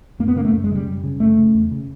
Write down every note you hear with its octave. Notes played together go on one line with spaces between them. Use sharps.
F#2 A#3
B3
C#3 A#3
A3
F#2
G#3
C#3 G3
F#2
C#3
F#2 A3
C#3
E2
C#3